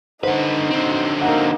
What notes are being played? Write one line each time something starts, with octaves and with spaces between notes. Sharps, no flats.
D3 D#4 B4 C5 F#5
D3 C4
A#3 D#4 F#5 A#5